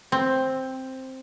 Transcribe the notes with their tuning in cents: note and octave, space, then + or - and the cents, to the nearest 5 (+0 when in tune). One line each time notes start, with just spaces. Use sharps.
C4 +5